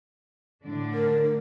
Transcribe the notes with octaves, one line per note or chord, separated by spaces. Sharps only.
A2 D3 D4
A#4